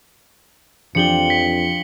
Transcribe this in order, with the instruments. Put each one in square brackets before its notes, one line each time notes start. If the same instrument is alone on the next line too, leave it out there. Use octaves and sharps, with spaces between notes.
[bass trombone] F2 [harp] F3 D4 G4 [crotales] C#7 F#7 G7
[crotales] B6